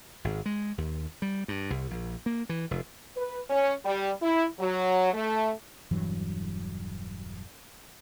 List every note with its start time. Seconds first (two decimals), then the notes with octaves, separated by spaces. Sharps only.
0.24 G#1
0.46 G#3
0.78 D#2
1.22 G3
1.48 G2
1.70 C2
1.91 A#1
2.26 A#3
2.49 E3
2.71 F1
3.16 B4
3.49 C#4
3.85 G3
4.21 E4
4.60 F#3
5.13 A3
5.91 E1 G2 E3 F#3